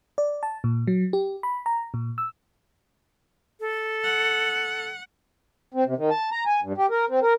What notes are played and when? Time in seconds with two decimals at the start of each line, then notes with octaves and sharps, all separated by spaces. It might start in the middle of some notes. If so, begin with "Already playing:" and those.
0.18 D5
0.43 A5
0.64 A#2
0.87 F#3
1.13 G4
1.43 B5
1.66 A#5
1.94 A#2
2.18 E6
3.60 A4
4.04 F#5
5.74 C4
5.85 C3
5.97 D#3
6.10 A5
6.32 A#5
6.46 G#5
6.62 G2
6.78 G4
6.90 A#4
7.09 C4
7.22 A#4